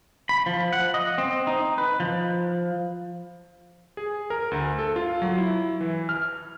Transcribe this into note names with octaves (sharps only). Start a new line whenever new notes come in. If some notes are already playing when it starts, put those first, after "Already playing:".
B5
F3
F#5
D#5
C4
D#4
B4
F3
G#4
A#4
D2
A4
F4
F#3
E4
E3
F6